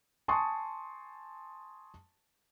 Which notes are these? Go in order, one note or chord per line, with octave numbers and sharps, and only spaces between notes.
G#5 A5 C6 C#6 D#6